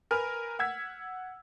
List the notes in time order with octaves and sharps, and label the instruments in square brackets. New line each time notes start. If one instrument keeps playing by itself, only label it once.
[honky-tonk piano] A#4 B4 G#5 F6
F#5 E6 G#6 B6